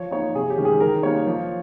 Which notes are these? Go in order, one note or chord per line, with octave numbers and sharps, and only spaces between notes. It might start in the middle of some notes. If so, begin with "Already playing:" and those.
Already playing: F3 C#5
A#3 D#4 C#5
C3 G#4
G4
D#3 G#3 C#4
G#4
D#3 A#4
G3 A#3 D#4 C#5
F3